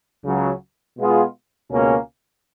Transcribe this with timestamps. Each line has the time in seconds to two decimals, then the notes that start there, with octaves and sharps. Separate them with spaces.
0.25 C#2 C#3 F#3
0.97 B2 G#3 B3 F4 G#4
1.70 C#2 B2 A#3 C#4